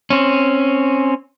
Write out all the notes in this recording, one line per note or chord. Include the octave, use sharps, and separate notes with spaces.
C4 C#4